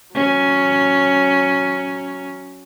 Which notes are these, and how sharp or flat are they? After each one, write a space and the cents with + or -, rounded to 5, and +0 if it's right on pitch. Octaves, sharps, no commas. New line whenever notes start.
F#3 +0 C#4 +5